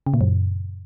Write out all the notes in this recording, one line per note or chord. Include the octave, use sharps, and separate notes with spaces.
C#3
A#2
F#2